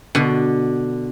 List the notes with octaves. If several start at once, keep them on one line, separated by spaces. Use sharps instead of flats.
B2 D3